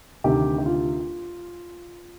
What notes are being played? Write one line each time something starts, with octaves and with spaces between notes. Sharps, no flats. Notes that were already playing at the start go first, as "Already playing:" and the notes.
D2 C3 D#3 G4
G4
F4